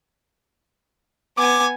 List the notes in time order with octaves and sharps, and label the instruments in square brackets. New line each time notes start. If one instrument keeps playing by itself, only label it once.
[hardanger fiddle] B3 G#5 [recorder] D6